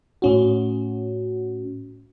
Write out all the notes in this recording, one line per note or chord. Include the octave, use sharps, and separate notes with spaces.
A2 C#4 F#4